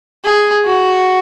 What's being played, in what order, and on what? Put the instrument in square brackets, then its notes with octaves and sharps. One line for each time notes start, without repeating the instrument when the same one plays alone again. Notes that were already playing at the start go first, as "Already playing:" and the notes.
[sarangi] G#4
F#4